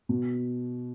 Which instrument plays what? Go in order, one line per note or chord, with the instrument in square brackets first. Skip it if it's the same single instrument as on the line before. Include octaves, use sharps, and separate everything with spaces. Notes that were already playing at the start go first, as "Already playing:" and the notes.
[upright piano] B2